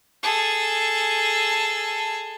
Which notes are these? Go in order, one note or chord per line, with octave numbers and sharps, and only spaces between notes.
G#4 A4